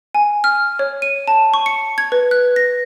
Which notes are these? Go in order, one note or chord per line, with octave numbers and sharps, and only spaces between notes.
G#5
F6
C#5
D#7
A5
C#6
C#7
G#6
B4
F#6
A#6